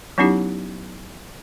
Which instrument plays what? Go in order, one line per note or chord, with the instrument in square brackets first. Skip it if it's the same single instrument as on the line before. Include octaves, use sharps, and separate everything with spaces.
[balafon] F#3 B3 C#4 D#4 E4 G4